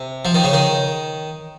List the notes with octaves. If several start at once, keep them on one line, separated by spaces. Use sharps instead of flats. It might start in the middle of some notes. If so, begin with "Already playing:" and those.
Already playing: C3
F3
D#3
C#3
D#3